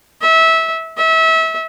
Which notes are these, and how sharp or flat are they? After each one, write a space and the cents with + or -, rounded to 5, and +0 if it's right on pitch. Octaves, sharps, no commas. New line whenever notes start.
E5 -20
E5 -30